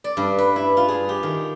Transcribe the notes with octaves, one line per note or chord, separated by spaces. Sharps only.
D5
G2
B4
E4
F4
G#4
G4
D#3